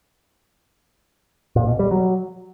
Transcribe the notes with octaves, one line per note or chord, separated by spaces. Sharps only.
A#2
B2
G3
F#3